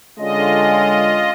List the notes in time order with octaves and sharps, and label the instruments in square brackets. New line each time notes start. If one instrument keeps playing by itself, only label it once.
[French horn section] D3 G#3 C#4 [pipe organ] F4 D#5